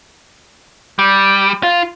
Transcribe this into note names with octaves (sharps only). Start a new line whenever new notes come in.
G3
F4